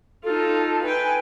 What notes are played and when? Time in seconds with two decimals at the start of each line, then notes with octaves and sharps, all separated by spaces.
0.24 D#4 F4 A4
0.83 B4 G5 G#5